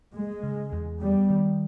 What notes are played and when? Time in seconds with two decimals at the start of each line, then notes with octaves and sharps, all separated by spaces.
0.14 G#3 A#3
0.43 C#3
0.72 E2
1.01 G3 B3
1.30 D#3